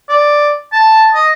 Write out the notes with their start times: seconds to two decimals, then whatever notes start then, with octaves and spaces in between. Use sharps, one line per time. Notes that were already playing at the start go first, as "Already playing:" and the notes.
0.09 D5
0.73 A5
1.15 D#5